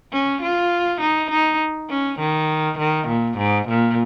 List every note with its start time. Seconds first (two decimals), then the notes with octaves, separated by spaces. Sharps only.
0.12 C#4
0.42 F4
1.01 D#4
1.30 D#4
1.89 C#4
2.19 D#3
2.79 D#3
3.08 A#2
3.38 G#2
3.68 A#2